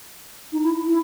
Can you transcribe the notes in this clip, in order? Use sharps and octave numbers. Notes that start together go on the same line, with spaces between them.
D#4
E4
E4